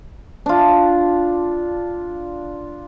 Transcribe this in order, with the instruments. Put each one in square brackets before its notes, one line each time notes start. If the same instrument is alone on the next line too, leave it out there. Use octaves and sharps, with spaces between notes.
[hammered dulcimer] D4 F4